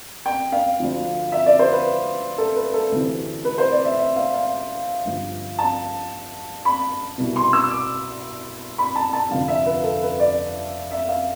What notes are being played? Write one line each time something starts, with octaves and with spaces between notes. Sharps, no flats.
G5
F5
D2 D3 F3
E5
D5
C5
B4
A4
B4
A4
D2 C3 E3
B4
C5
D5
E5
E5
F5
F5
G1 G2 F3
A5
B5
C2 B2
C6
E6
D6
B5
A5
A5
F1 F2 D3 F3 F5
E5
B4
A4
B4
D5
E5
F5